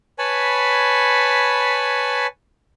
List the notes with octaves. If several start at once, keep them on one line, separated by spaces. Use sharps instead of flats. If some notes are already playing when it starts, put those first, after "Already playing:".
B4 C#5 G#5 A5 B5